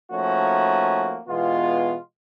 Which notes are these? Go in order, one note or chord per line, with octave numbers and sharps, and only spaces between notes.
F3 A3 A#3 C#4 D#4 F#4
B2 E3 G#3 B3 F4